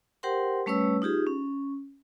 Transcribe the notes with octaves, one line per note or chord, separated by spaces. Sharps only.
G4 A#4 C5 F#5 G5 C6
G3 A3 C#4 B4 C#5 E6
D#4 F4 G4 G#4
C#4